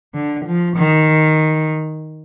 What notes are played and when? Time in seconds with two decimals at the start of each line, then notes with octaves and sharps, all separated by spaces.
0.14 D3
0.45 F3
0.77 D#3